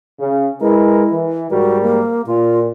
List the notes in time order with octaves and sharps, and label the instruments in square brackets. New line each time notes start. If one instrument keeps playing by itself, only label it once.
[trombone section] C#3
[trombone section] G#3 A#4 B4 [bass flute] E4
[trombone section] E3
[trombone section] G#2 G3 A#4 [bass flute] F#4
[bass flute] A#3
[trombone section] A#2 [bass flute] F4